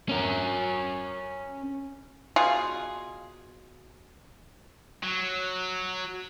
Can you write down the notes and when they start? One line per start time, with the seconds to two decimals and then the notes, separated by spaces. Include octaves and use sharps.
0.09 C#4 A#4
2.36 B2 F4 G#4
5.03 F#3